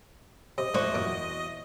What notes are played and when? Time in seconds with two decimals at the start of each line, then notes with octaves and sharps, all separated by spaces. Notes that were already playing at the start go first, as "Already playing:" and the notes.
0.58 C3 D#5
0.74 E2 A3 D4 F#4 C5
0.94 F#2 A#2 F4